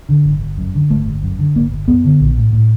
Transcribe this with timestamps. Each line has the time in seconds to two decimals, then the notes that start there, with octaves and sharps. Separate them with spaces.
0.09 D3
0.25 G1
0.41 G1
0.58 F#2
0.75 D3
0.90 G1 A3
1.07 G1
1.22 F#2
1.39 D3
1.55 G1 A#3
1.72 G1
1.88 F#2 B3
2.04 D3
2.20 A#1
2.37 A2
2.53 A2